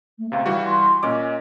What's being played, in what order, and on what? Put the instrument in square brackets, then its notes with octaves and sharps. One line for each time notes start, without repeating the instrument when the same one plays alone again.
[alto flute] A3
[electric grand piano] C#2 C3 [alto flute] F5
[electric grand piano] E3 G3 F#4
[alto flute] C6
[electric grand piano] A#2 C#4 D6 [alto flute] D#5